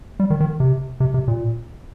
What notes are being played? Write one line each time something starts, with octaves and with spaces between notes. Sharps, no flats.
G3
D#3
D#3
C3
C3
C3
A#2